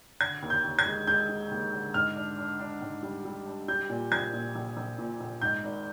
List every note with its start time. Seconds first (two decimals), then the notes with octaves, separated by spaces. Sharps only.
0.21 D3 G#6
0.42 D#2
0.50 G6
0.64 D#2
0.79 G#6
0.86 G#3
1.07 G#3 G6
1.29 G#3
1.51 D#2
1.73 D3
1.94 G#2 F6
2.16 D4
2.38 D4
2.60 D4
2.82 G#2
3.03 G3
3.25 G3
3.47 D4
3.68 G3 G6
3.89 A#2
4.12 A#1 G#6
4.33 A#2
4.55 A#1
4.77 A#1
4.98 A#2
5.20 A#1
5.41 G#2 G6
5.63 G#1